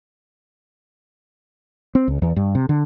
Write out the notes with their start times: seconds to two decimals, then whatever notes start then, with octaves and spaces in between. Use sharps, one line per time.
1.95 C4
2.08 C#2
2.22 E2
2.36 G2
2.55 C3
2.69 D3